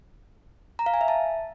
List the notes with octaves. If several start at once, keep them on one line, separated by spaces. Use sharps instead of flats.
A#5
F5
G#5
E5
A5